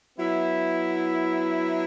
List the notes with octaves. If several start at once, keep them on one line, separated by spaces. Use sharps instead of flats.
F#3 B3 E4